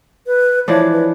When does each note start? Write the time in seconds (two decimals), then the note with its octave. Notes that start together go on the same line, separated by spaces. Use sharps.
0.27 B4
0.68 E3 F3 D4 C#5
0.92 B4